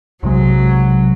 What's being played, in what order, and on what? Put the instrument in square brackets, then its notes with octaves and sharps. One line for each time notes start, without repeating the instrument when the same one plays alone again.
[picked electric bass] B1 C3 G#3 [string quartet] F#3